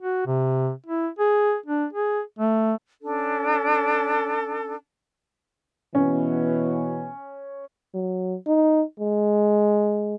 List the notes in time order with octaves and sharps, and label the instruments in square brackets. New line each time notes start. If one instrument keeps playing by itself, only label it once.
[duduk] F#4
C3
E4
G#4
D4
G#4
A3
[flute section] C#4 D4 A4
[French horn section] B2 E3 B3 [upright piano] C#4
[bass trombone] F#3
D#4
G#3